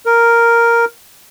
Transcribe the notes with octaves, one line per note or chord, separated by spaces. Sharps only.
A#4